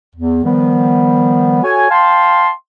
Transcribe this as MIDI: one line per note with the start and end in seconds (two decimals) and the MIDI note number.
0.16 0.43 40
0.44 1.62 51
0.44 1.62 53
0.44 1.62 55
0.44 1.62 59
1.64 1.87 66
1.64 1.87 69
1.64 1.87 73
1.64 1.87 80
1.91 2.50 77
1.91 2.50 79
1.91 2.50 81
1.91 2.50 84